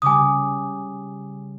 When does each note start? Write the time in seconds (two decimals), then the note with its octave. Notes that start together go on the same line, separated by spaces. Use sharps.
0.02 C#3 G3 G#5 D6 D#6